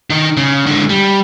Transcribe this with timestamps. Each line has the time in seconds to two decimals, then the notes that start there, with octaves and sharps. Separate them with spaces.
0.10 D#3 D#4
0.37 C#3
0.66 D3 G#3
0.90 G3